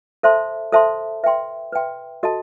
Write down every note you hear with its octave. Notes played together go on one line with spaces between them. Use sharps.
A4 C5 E5 A5 C6
A4 C5 E5 A5 C6
B4 E5 G5 C6
B4 E5 G5 C6
F#4 A4 D#5 A5